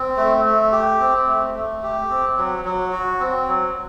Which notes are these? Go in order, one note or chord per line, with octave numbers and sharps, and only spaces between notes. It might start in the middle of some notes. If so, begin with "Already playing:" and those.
Already playing: C4
A3
A3
G4
C4
A3
A3
G4
C4
F#3
F#3
F#4
C4
F#3